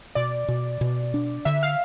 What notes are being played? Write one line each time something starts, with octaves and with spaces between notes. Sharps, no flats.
B2 D5
B2
B2
D4
D3 E5
F5